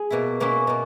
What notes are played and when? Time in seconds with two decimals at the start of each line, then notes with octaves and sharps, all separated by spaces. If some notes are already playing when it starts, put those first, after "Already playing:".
Already playing: G#4
0.10 B2 A#3 E4
0.40 B2 A#3 C#4 E4
0.67 B2 A#3